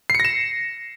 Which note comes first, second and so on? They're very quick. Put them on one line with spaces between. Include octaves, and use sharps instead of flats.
C7 C#7 A#6 E7